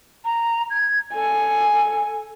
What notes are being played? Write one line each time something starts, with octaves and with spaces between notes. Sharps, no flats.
A#5
G#6
A4 G#5